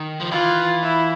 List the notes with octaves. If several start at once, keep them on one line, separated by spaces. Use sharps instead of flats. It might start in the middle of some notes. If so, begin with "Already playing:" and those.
Already playing: D#3
F3
E3 F4
E4